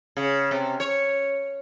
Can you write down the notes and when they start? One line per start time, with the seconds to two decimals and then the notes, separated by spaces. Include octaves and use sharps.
0.17 C#3
0.51 C3
0.80 C#5